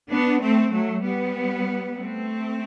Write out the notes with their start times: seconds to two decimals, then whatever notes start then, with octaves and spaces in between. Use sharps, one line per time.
0.10 B3 D4
0.41 A3 C4
0.72 F#3 A3
1.04 G3 B3
1.96 A3 C4